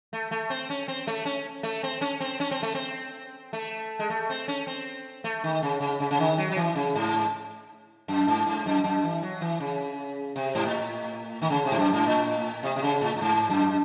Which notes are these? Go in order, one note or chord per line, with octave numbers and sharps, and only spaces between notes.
A3
A3
C4
C#4
C4
A3
C#4
A3
C4
C#4
C4
C#4
C4
A3
C4
A3
G#3
A3
C4
C#4
C4
A3
D#3
C#3
C#3
C#3
C#3
D#3
F#3
F#3
E3
C#3
G#2
F#2
G#2
G#2
F#2
F#2
E3
F#3
E3
C#3
C3
G#2
A2
D#3
C#3
C3
G#2
F#2
G#2
A2
C3
C3
C#3
A2
A2
G#2
F#2